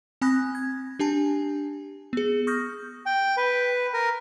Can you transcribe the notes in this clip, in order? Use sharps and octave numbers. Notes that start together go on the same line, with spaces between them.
C4 G#5 B5 D#6 F#6 A#6
G#6
D4 G4 G#5 A5
B3 G#4
C#6 D#6 F6 G6 A#6
G5
B4
A#4